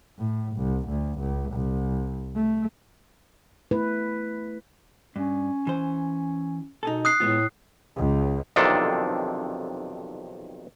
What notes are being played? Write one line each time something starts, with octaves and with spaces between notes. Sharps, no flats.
A2
C2
D2
C#2
C2
A3
A3 E4 B4
G2 C#4
E3 C5
B2 D#4 G#4 A4
D#6 F#6 C7
A2 G#3 B3 F4
C#2
B1 F2 C3 D#3 D4 A4